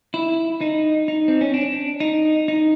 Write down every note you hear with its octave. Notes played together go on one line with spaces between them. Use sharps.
E4
D#4
D#4
C4
C#4
D4
D#4
D#4